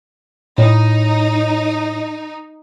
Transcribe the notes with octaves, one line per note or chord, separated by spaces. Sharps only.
A2 D#4